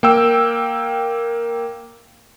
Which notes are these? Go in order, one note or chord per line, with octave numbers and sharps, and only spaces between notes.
A#3 G5 E6